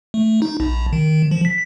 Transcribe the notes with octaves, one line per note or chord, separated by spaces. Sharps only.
A3
D#4
A#1
D#3
F3
B6